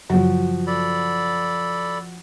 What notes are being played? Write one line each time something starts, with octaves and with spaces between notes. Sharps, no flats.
F#2 C#3 F3 F#3 F#4
A4 D5 B5